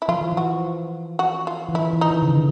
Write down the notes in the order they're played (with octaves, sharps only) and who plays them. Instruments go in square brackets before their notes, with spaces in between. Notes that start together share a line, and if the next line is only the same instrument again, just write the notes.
[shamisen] E4
[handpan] F3 [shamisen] F4
[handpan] E3
F3
[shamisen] F#4
F#4
F4
[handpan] E3
[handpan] F3 [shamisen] E4
[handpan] E3
[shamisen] D#4
[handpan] D#3
C#3
D3